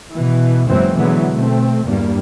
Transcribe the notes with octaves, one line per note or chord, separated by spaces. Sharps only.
B2 E3
F#1 F#2 E3 F#3 G#3 C4
B2 D3 E3 F#3 G#3 B3
B2 A3 C4
G1 E2 G2 G3 A#3